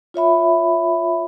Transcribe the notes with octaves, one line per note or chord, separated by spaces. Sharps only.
F4 C#5 E5 B5